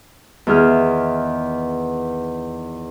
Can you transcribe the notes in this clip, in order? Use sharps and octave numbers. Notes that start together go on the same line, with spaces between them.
E2 D#3 G#4 F6